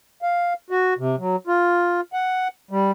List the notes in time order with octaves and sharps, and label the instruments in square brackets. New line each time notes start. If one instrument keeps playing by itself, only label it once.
[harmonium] F5
F#4
C3
F#3
F4
F#5
G3